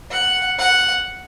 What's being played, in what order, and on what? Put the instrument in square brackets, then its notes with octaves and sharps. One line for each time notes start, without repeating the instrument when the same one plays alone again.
[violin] F#5
F#5